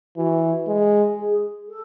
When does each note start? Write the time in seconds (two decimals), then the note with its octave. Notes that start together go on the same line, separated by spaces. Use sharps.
0.17 E3 F#4
0.68 G#3
1.19 G#4
1.69 A4